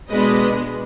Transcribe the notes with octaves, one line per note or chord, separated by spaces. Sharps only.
B2 G#3 B3 D4 B4 D#5